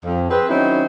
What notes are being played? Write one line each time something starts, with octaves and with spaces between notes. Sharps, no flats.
F2
C4 G#4 B4
D#3 F#3 C4 C#4 D#4 E4